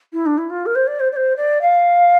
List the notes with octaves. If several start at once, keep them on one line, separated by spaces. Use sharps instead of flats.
E4
D4
E4
F4
A#4
C5
D5
C5
D5
C5
D5
F5